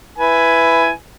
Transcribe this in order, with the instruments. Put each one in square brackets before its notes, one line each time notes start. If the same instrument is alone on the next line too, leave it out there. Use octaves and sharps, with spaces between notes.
[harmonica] E4 B4 G#5